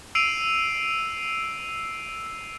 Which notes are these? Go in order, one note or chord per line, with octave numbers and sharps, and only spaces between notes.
E6 C7 D7 D#7 F7